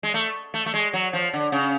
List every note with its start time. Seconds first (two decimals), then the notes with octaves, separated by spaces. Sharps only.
0.03 G#3
0.14 A3
0.54 A3
0.66 A3
0.74 G#3
0.93 F#3
1.13 F3
1.33 D3
1.52 C#3